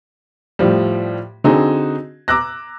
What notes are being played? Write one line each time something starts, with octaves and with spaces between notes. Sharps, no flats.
A2 F3 G3
D3 C4 D#4 F#4 G#4
A#5 D6 E6 F#6 A#6